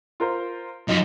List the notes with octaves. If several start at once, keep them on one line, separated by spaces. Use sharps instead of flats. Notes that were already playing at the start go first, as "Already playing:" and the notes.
F4 A#4 C5
F#2 D#4 F4